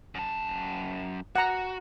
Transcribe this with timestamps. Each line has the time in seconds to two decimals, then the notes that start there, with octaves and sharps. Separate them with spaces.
0.15 F#2 A5
1.36 F#4 F#5 A#5